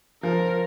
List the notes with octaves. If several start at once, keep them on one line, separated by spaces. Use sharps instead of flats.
F3 A#4